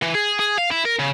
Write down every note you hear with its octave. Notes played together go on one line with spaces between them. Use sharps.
E3
G#4
G#4
F5
E4
A#4
C#3